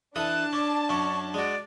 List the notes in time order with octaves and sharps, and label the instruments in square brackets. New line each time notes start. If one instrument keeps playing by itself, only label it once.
[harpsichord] E3 A4 D#6 [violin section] D4 A5 [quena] F#6
[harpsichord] C#4 [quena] D6
[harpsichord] F#2 C#4 D6 [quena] C#6
[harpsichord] G#3 F#4 [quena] D5